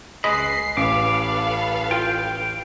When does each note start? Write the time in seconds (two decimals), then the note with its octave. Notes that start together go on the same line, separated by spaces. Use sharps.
0.24 C#2 G#3 B4 D#5 B5 C7
0.77 A1 C#4 A4 B4 F5 D6 C7
1.91 F4 G5